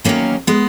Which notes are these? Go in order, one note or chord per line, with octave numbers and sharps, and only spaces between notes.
E2 D#3 F#3 A#3 C#4
G#3 B3